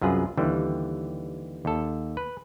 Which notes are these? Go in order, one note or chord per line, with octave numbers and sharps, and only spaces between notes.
C2 F#2 F4 G#4 B4
D#2 D3 E3 G3
D#2 A4
B4